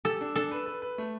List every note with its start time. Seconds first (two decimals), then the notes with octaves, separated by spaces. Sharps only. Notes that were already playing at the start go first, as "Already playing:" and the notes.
0.05 G4 A4
0.21 D4
0.36 D4 A4
0.52 B4
0.66 B4
0.82 B4
0.98 A3